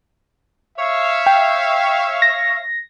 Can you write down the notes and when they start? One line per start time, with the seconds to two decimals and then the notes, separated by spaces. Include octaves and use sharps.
0.79 C#5 E5 F5
1.26 G5
2.22 A#6